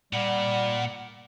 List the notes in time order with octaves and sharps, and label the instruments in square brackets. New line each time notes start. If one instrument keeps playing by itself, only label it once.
[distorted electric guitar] A#2 A#3 [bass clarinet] G3 [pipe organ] F#5